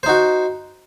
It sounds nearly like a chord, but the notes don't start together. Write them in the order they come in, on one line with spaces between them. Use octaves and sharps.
C5 D#4 F#4